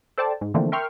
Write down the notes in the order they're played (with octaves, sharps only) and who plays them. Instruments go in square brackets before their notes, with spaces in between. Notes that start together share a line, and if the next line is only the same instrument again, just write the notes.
[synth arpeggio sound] A4 C5 D5 G5 A5
G#2
D3 E3 F3 A3 A#3 C4
A#4 E5 G5 C6 C#6 F6